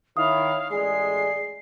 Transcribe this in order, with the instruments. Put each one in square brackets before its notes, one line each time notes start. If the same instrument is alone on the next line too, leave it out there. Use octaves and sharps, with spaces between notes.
[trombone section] D#3 E4 [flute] C#5 [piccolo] F5 [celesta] D#6
[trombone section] A1 G#3 G#4 [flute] D5 [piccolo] C7